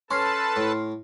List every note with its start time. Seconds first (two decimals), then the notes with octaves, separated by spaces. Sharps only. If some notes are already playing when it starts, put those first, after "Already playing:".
0.11 C#4 A4 B4 A5 C6 F6 C7
0.56 A2